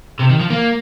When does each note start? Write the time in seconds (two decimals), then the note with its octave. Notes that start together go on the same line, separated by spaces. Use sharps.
0.19 C3
0.29 D#3
0.40 F3
0.50 A#3